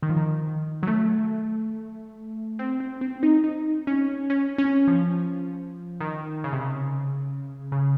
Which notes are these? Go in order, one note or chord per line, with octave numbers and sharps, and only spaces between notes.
D#3
F3
D#3
F#3
A3
C4
C4
C4
D#4
D#4
C#4
C#4
C#4
F3
D#3
C#3
C3
C#3
C#3